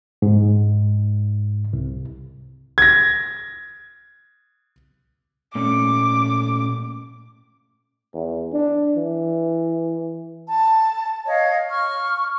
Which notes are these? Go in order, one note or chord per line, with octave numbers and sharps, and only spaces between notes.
G#2
C2
G#6 A#6
A#2 A3 C#4 D6
E2
D4
E3
A5
C#5 D#5 F5
C#6 F6